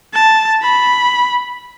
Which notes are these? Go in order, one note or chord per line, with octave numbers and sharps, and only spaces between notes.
A5
B5